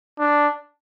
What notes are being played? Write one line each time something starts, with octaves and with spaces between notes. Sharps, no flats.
D4